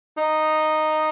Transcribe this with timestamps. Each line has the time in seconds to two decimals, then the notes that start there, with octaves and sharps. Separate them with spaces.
0.18 D#4